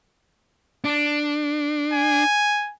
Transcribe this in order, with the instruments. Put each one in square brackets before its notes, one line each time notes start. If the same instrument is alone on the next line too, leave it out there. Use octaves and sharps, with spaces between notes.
[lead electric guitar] D4
[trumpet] G#5